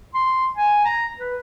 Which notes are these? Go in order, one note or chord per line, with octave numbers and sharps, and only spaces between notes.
C6
G#5
A#5
B4